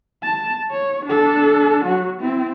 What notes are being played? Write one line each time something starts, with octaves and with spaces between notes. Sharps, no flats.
A5
C#5
D4 A4
F#3 F#4
C4 E4